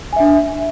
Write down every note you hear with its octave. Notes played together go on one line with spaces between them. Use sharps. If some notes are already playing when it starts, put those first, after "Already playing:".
D4 E5 G#5